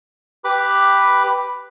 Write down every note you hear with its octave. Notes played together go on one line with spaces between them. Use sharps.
G4 B4 B5 D6